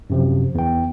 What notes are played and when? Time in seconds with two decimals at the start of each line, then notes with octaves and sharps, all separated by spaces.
0.10 F#2 C3 F3
0.55 E2 G5